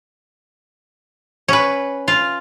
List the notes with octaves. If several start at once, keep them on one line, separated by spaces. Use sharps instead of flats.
C#4 B4
F4